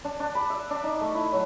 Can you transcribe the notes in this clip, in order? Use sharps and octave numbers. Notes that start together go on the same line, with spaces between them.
D4
D4
B5
E5
D4
D#4
A3
E4
F#3